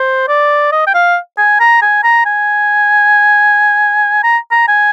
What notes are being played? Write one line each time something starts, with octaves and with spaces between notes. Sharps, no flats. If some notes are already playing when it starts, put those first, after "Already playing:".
Already playing: C5
D5
D#5
G5
F5
G#5
A#5
G#5
A#5
G#5
A#5
A#5
G#5